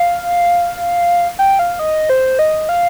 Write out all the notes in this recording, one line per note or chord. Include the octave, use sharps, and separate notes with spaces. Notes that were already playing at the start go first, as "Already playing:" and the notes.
Already playing: F5
G5
F5
D#5
C5
D#5
F5